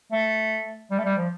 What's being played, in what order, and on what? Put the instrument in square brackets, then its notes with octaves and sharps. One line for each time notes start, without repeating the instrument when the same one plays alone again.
[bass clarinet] A3
G3
A3
G3
F3